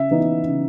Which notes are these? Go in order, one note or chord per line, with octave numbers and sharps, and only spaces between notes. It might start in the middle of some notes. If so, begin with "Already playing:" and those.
Already playing: C#3 E5
E3 B3 D#4
C#3